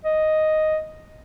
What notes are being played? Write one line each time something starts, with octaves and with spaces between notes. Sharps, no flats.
D#5